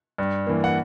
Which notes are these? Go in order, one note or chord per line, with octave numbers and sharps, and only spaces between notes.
G2
E3 A#3
F#5